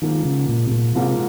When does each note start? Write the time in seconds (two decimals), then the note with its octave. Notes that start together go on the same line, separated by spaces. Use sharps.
0.02 G#2 D#3 F3 A#3
0.25 C#3
0.49 A#2
0.66 C3
0.72 A#2
0.95 G#2 C3 F3 A#3